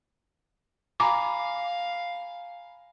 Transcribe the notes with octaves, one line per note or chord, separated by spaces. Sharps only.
F5 G#5 A#5 B5 D6